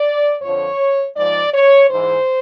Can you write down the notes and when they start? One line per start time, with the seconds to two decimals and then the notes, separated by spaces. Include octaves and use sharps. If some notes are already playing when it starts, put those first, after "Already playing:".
Already playing: D5
0.43 F2 D3 F3 C#5
1.16 G#2 F3 D5
1.54 C#5
1.90 G#2 E3 C5